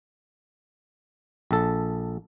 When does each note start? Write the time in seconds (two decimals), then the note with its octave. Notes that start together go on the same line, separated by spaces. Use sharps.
1.51 A#1 A4